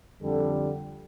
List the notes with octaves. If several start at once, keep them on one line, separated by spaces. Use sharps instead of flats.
F2 D3 G3 A4